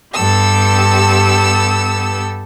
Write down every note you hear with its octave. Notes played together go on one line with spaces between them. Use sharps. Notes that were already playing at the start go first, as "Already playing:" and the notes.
G2 B3 G4 A4 E6